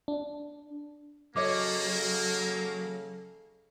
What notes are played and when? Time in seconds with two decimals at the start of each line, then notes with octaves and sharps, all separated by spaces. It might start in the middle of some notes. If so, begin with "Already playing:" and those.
0.08 D4
1.36 C#3 F#3 A#3 A4 C#5 D#5 D6